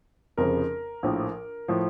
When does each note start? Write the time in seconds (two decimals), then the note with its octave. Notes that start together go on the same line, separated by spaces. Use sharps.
0.38 F1 F2 C#3 F3 A#4
1.03 A#1 A2 F3
1.68 A2 F3